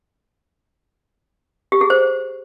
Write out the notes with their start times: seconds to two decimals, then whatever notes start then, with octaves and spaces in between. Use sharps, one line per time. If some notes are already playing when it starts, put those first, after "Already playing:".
1.72 G4
1.81 G#4
1.90 C5